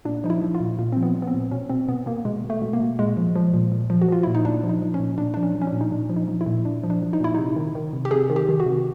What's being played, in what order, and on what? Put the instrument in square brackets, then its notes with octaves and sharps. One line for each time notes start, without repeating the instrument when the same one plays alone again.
[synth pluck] A#2 D4
F3 D#4
E4
F3
F4
A#2
A#2 F4
F3 C4
B3
F3
B3
C4
A#2
B2 C#4
B2 C4
B2 B3
B2 A#3
B2 G#3
B2
A3
B2
A#3
B2
A#2 G#3
F3
F3
A#2
A#2
F3
F#4
F3 F4
A#2 E4
D#4
A#2 D4
F3
D#4
F3
C#4
A#2
A#2 D4
F3 D4
C#4
F3
C#4
D4
A#2
D#4
A#2 D4
F3
D#4
F3
E4
A#2
A#2 D4
F3
D4
F3
D#4
A#2 E4
C3 D#4
D#3
D#3
C3
G4
C3 G#4
D#3
G4
D#3
F#4
C3